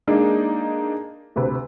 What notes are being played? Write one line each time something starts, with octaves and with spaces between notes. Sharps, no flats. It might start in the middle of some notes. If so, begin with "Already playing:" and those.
G#3 A#3 D4 D#4
D2 C3 B4